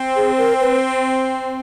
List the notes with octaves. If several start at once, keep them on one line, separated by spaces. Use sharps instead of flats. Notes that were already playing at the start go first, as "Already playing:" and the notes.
Already playing: C4
G#4
A#4
B4